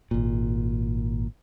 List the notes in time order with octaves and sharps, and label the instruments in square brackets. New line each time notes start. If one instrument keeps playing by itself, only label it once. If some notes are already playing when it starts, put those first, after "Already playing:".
[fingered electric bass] G#1 A#2